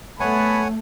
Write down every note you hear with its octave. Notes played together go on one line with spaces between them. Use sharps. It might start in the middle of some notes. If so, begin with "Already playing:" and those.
A3 B3 C#5 F#5 G#5 A5 B5